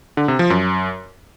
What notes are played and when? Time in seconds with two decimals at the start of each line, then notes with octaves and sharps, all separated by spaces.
0.17 D3
0.28 C3
0.39 F3
0.50 F#2